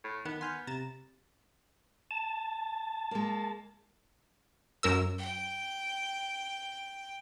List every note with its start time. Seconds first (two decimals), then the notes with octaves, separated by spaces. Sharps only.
0.04 A2
0.25 D#3 B3 F#5
0.41 F#5 G#5 C6 F6 G6
0.67 C3 A#5 A6 E7
2.11 A5
3.11 G#3 A#3
4.83 F#2 A#4 E6
5.18 G5